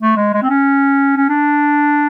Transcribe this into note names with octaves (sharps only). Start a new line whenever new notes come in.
A3
G#3
G#3
C4
C#4
C#4
D4